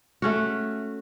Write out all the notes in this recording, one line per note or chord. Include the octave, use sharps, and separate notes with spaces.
A3 C#4 F#4